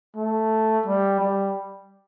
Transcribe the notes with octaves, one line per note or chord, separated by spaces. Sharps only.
A3
G3
G3